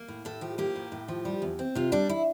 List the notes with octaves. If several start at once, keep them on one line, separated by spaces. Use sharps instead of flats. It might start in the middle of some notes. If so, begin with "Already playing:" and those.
Already playing: A#3
A2
A2 A4
F3 G4
A#3 G4
A2
A2
F3
G3
E2
C4
C3 F4
G3 D4
E4